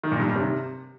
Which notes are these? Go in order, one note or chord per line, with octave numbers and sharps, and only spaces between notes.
D#3
A#2
G2
D#3
C3